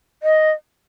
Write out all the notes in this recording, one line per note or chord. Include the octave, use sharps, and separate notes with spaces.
D#5